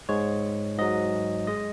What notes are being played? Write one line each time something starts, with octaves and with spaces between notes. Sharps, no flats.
G#2 G#3 C#5
G#2 F#3 D#5
G#3 D#5